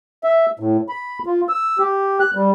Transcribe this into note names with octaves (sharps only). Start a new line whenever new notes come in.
E5
A2
B5
F4
E6
G4
F#6
G3